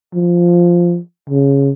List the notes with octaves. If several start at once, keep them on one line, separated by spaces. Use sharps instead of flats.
F3
C#3